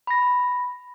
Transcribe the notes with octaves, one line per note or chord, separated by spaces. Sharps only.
B5 A#6